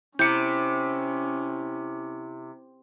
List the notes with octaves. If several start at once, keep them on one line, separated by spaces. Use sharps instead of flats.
C3 C#4 E4 D6 G6 C#7